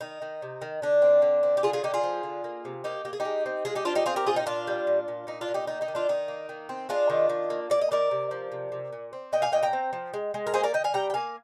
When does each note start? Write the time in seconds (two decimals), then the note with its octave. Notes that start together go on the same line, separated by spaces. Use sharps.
0.01 D#3 D#4
0.22 D#3
0.42 C3
0.62 D#3
0.82 D3 D4
1.02 C4
1.22 D3
1.43 C4
1.57 G4
1.63 D3 F4 G#4
1.73 F4 G#4
1.83 D3 D#4 G4
1.94 F4 G#4
2.04 F3
2.23 D3
2.44 A#3
2.65 C3
2.84 A#3 D#4 G4
3.05 A#3 G4
3.13 G#4
3.20 D#4 G4
3.25 G#3
3.46 C4
3.65 G#3 F4 G#4
3.75 D#4 G4
3.85 F3 D4 F4
3.95 D#4 G4
4.06 C4 F4 G#4
4.16 G4 A#4
4.26 A#2 F4 G#4
4.36 D#4 G4
4.46 A#2 D4 F4
4.67 G3
4.87 A#2
5.08 A#2
5.27 A#2 D#4
5.41 D4 F4
5.48 A#2
5.54 D#4 G4
5.67 D#3 D#4
5.81 D#4 G4
5.88 D#3
5.95 D4 F4
6.09 D#3 D#4
6.28 A#3
6.49 D#3
6.69 C4
6.89 G#3 D4 F4
7.10 D#3
7.29 D#3
7.50 A#3
7.70 A#3 D5
7.81 D#5
7.91 D#3 A#4 D5
8.11 C3
8.31 F3
8.52 C3
8.72 C3
8.92 A#2
9.13 C4
9.32 A#2 D#5 G5
9.42 F5 G#5
9.52 A#2 D#5 G5
9.63 G5 A#5
9.73 C4
9.93 F3
10.14 G#3
10.34 G#3
10.47 A#4
10.54 A#3 G#4 C5
10.64 A#4 D5
10.74 D3 D#5 G5
10.84 F5 G#5
10.94 G3 G5 A#5
11.10 G5
11.14 A#3 F5 G#5